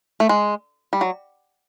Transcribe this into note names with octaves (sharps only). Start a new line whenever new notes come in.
A3
G#3
G3
F#3